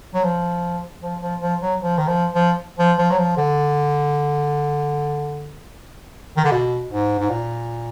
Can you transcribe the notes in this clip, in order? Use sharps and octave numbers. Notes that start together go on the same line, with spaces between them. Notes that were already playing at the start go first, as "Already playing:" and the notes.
F#3
F3
F3
F3
F3
F#3
F3
D#3
F3
F3
F3
F3
F#3
F3
D3
D#3
D3
B2
G#2
G#2
A#2